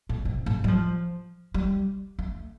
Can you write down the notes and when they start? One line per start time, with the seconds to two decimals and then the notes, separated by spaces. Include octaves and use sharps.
0.09 A2
0.25 C3
0.46 A2
0.64 G3
0.68 F3
1.54 G3
2.19 A3